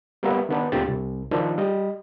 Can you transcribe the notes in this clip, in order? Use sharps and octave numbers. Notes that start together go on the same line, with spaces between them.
G3 A#3 B3 E5
D#3 B3 D4
D2 A#2 D3 C4 G4 A6
C2
D#3 F3 D4
G3 D#5